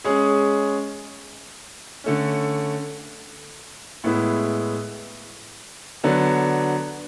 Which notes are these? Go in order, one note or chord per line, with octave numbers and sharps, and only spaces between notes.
G#3 C#4 G#4
D3 A3 C#4
A2 G#3 B3 E4
D3 F#3 B3 D4